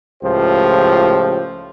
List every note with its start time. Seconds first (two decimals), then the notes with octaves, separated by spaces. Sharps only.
0.23 C#2 A2 F3 G4 C5